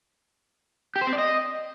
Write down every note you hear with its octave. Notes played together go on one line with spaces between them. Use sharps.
G4
C5
C4
D5
D#5